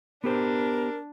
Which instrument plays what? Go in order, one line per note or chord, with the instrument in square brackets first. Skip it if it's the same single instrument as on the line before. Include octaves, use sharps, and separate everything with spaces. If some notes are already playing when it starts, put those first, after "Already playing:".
[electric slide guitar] B3 G4 C5 [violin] D4 [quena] A#4